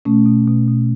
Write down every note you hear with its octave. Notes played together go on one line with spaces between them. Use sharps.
B2 A3 C#4
B2
B2
B2